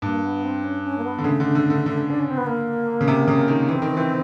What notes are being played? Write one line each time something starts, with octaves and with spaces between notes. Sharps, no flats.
G2 A#3
B3
C4
C#4
C#4
A#3
B3
D3
C#3 A3
D3
D3
D3
D3
D4
C#4
C4
B3
A#3
C#3
C3
C#3
D#3
E3 C4
D#3
E3